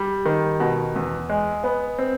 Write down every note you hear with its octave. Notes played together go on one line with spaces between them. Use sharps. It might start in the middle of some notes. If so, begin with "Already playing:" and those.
Already playing: G3
D#3
B2
E2
G#3
B3
C4